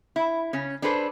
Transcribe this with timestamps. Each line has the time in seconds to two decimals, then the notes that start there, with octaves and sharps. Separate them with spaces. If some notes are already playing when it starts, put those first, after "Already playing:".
0.16 E4
0.53 C#3 C#4
0.82 D4 G#4 A4 B4 C5